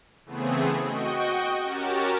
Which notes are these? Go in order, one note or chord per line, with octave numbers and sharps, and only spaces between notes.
C#3 E3 A3 B3 C4 G#4
F#4 D#5 G5 C#6
C#4 F#4 G4 A#4 A6 E7